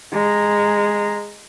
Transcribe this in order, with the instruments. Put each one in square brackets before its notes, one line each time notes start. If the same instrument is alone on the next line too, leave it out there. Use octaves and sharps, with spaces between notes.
[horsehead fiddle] G#3 A#5